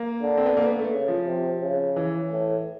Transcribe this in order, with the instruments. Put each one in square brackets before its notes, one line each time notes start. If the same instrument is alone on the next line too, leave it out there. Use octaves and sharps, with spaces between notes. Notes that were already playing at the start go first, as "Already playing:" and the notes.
Already playing: [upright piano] A#3
[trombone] D3
[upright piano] C4
B3
A#3
B3
A3
[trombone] C#3
[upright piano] F3
[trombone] C3
C#3
[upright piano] E3
[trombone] A2